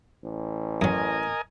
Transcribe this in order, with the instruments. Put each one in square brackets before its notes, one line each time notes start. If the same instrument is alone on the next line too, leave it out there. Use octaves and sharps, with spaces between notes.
[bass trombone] A1
[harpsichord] F#2 F#3 [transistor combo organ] A#4 D#5 G#5